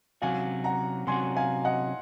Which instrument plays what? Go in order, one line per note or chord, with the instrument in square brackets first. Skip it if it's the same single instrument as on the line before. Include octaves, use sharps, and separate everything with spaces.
[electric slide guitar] C3 F#3 C#4 F#4 [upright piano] F5 G#5
[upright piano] F#5 A#5
[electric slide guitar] C3 F#3 C#4 F#4 [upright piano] G#5 C6
[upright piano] F5 G#5
D#5 F#5